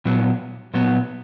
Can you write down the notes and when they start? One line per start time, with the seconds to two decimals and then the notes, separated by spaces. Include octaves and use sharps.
0.05 A#2 F#3 B3
0.74 A#2 F#3 B3